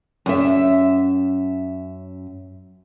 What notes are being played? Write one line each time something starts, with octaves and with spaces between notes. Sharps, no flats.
F#2 E5